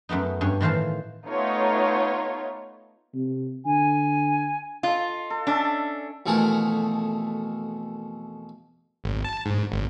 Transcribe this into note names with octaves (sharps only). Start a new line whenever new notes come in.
F#2 A3 B3 D#4
G2 C#4 G#5
A2 D#3 E3 C5 F5 A5
A3 B3 D#4 F4 C#5
C3
D3 G#5
F4 A4 D#5
A4
C#4 D4 E5
F2 B2 E3 A3 G#4 A#4
G#1
A5
G#2
G#1